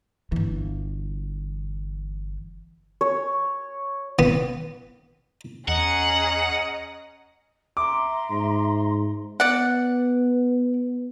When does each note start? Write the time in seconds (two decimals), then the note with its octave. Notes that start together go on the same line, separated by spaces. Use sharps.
0.32 G1 E3
3.01 C#5
4.19 B3
5.68 E2 C#4 G#4 D#5 F#5 A#5
7.77 E5 A#5 C6 D6
8.30 G#2
9.40 B3 D5 F#5